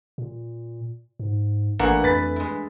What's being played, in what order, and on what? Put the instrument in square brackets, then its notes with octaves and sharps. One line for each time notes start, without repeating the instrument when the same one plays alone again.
[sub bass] A#2
G#2
[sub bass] G#1 [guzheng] G2 E3 A3 [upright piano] A#3 F#5 A#5
[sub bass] F2 [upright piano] B4 A6 B6
[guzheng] G#3 E4